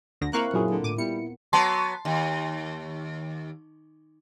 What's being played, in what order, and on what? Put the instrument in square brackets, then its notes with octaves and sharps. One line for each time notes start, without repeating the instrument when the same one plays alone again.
[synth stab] D2 D3 A#6
[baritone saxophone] A#3 [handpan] C4 E4 A#4 [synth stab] F5 C#6 F#6
[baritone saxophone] F#2 [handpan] A#2 F4 [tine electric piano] F#3 E4 G#4
[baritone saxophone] D3
[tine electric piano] A2 [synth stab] D6 D#7
[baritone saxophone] G3 [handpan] B3 [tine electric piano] E4 [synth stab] C#7
[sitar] F#3 B3 [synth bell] A5 C6
[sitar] D#2